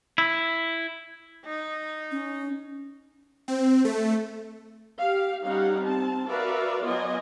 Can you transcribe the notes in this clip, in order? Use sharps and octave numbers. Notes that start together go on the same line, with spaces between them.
E4
D#4
C#4
C4
A3
G4 F5
G3 C#4 D#4 G4 F5 F#5
C4 A5
F#4 A#4 B4 D5 E5 F5
F#3 B3 F4 D5 D#5 G#5